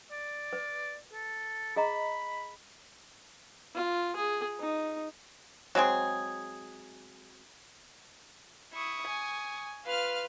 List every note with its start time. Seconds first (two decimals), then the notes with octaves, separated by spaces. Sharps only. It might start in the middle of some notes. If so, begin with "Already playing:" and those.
0.11 D5
0.53 B4
1.13 A4
1.76 G#4 D#5 A#5 B5
3.75 F4
4.16 G#4
4.60 D#4
5.75 F#3 G#3 C4 G#4
8.73 E4 C#6 D#6
9.07 G#5
9.85 F4 B4 F5 F6